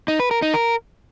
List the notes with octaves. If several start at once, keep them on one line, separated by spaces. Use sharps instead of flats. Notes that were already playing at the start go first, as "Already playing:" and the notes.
D#4
B4
A#4
D#4
A#4